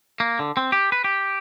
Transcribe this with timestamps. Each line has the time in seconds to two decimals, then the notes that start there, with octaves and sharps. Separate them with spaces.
0.20 A#3
0.39 D3
0.57 C4
0.72 G4
0.92 B4
1.04 G4